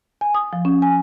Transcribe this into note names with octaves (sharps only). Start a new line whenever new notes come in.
G#5
D#6
F3
C#4
G#5